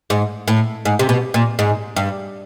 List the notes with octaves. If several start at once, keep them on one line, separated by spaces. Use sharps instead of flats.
G#2
A2
G#2
C3
B2
A#2
G#2
G2